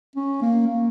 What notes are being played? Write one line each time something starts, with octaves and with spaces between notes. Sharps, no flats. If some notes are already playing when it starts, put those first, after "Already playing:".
C#4
A#3
A#3